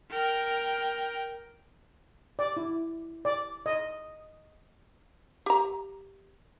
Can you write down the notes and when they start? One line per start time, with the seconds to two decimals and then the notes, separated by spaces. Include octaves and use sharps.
0.11 A#4 G5
2.39 D5
2.57 E4
3.25 D5
3.66 D#5
5.46 G4 A#5